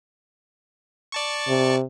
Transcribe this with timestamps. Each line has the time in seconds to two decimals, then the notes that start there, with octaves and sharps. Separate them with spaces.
1.12 D5 A5 C#6
1.48 C3